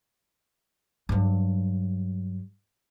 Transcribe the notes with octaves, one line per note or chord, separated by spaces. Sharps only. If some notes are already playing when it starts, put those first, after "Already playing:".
G2 F#3